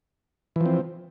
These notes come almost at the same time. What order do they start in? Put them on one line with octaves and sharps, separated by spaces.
E3 F3 C4